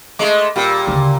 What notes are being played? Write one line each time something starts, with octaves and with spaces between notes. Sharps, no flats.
G#3 A3 B5 D6
A#2 G3 G5 E6
D2 C#3